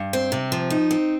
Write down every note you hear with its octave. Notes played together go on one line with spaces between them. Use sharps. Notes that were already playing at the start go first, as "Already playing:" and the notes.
Already playing: G2
C4
C3
F3
D#4
C4